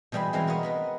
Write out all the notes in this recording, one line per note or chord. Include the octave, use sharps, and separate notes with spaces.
B2 E3 G3 G#4 C5 B5
E3 G#3 C4 F5 A#5
F#4 A#4 B4 C#5 D#5
B3 A#4 B4